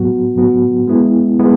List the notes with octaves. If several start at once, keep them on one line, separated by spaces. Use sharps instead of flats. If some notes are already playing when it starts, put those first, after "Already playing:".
Already playing: A2 F#3 B3 F#4
A2 F#3 B3 F#4
G#3 B3 E4
G#3 B3 E4